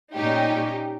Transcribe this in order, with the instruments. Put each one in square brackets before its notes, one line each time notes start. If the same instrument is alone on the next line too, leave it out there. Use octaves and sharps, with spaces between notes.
[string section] A#2 G3 C#4 D#4 G4